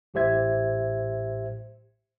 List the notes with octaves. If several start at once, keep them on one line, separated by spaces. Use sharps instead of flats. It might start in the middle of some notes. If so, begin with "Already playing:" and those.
A1 A2 G4 C5 E5 G#6